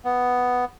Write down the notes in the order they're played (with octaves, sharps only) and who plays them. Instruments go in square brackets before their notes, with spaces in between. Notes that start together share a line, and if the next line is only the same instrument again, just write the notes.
[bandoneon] B3